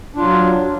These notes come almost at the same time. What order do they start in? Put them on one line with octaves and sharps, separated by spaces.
D4 F4 F#3